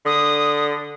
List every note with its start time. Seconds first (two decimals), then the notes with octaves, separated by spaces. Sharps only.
0.06 D3 D#6